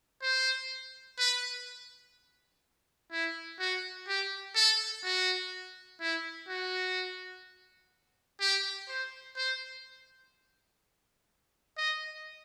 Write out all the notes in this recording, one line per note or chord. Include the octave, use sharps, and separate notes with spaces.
C5
B4
E4
F#4
G4
A4
F#4
E4
F#4
G4
C5
C5
D#5